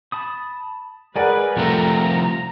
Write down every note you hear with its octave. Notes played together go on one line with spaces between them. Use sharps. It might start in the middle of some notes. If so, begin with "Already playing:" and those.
A5 B5 D#6
G#3 G#4 A#4 B4 D5 F#5 G#5
C2 F3 A3 C4 G4 A#5